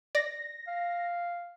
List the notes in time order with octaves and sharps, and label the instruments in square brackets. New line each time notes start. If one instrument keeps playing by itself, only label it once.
[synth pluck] D5 [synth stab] A#6
[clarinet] F5